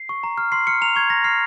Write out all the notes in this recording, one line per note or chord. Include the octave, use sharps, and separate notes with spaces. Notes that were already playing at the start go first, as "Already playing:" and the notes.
Already playing: C7
C#6
A#5
F6
C6 C7
F6 C#7
A#5 F7
C#6 G#6
A#5 A#6
F6 C7